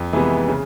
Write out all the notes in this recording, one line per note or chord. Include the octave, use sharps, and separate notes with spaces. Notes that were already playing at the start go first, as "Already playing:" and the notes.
Already playing: F2
C3 E3 G#3 B3
C#3